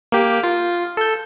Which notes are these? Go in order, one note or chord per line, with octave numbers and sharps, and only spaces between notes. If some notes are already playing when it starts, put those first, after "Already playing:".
A#3 G4
F4
A4 G6